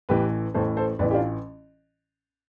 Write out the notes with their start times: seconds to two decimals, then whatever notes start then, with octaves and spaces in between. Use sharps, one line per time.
0.09 A1 A2 E3 G4 B4
0.54 A1 A2 E3 A4 C5
0.77 A4 C5
0.99 A1 A2 E3 B4 D5
1.11 G4
1.14 D4 F4